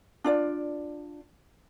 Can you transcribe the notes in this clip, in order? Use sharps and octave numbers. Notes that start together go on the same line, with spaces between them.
D4 F4 D5